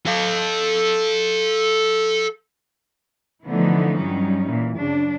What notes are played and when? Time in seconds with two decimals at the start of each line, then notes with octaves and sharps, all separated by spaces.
0.06 A4 F5
3.45 D3 E3 F3 A3 B3 D#4
3.98 G2 F#3 G3 C#4 D#4
4.48 A#2 E3
4.78 F#2 C#3 D4